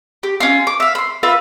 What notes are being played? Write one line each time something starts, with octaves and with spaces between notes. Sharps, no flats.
G4
C#4 F4
D6
E5 F5
B5 C6
F4 B4 E5